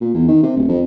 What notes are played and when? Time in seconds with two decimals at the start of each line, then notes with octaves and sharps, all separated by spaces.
0.01 A#2
0.14 E2
0.28 D#3
0.43 C3
0.56 D1
0.68 F2